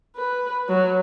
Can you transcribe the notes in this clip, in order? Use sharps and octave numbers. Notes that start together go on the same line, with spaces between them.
B4
F#3